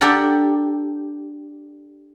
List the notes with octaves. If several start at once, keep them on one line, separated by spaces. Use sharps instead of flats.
D4 G4 A4 D5 F#5 A#5